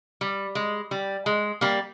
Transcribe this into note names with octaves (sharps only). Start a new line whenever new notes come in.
G3
G#3
G3
G#3
G3 A#3